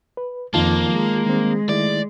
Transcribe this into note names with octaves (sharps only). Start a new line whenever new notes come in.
B4
F2 D#3 A#3 F4 A5
G#3
D#3 G3 C4
D#3 A3 E4 D5